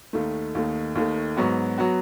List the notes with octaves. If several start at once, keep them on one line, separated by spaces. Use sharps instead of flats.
D#2 D#3 A3
D#2 D#3 A3
D#2 D#3 A3
G#2 F#3 B3 F#4
F#3 B3 F#4